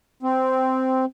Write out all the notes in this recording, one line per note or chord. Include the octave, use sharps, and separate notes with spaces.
C4